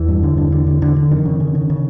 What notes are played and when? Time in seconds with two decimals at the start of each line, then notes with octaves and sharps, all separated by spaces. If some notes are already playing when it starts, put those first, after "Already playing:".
Already playing: E2 E3
0.08 G2
0.23 D3
0.37 D3
0.52 D3
0.67 D3
0.82 D3
0.96 D3
1.11 F2 D#3
1.25 C#3
1.40 C#3
1.55 C#3
1.70 C#3